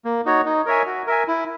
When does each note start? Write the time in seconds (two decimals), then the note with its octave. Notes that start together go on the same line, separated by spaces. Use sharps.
0.05 A#3
0.25 D#4 F#4 C#5
0.45 D#4
0.66 A#4 C#5 E5 G#5
0.86 F#4
1.07 A#4 E5 G#5
1.28 E4